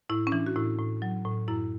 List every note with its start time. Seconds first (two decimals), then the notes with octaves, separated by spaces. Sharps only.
0.09 A2 E4
0.27 C#4
0.32 E3 D4
0.46 F#4
0.56 A2 E4
0.78 A2
1.02 F#3
1.25 A2
1.48 F#2 E4